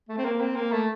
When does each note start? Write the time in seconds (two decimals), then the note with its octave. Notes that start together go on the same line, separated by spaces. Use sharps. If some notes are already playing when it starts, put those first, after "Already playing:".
0.09 A3
0.18 C4
0.25 A#3
0.40 C4
0.56 A#3
0.72 A3